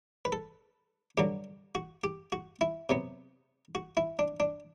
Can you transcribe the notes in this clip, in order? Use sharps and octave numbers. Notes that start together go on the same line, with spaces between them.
B4
A4
G2 D3 F#3 G4
F#4
G4
F#4
E4
C3 F#3 B3
F#4
E4
D4
D4